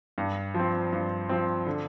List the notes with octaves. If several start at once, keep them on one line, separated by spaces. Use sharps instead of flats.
G2
F3
C4
G2
F3 C4
D3